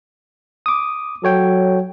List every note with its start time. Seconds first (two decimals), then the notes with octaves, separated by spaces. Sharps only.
0.66 D6 D#6
1.24 F#3 A4 C#5 G5